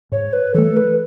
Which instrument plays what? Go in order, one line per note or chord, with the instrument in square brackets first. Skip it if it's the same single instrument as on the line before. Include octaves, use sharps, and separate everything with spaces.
[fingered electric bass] G#2 [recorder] C#5
[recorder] B4
[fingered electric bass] E3 A3 [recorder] A4
[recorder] B4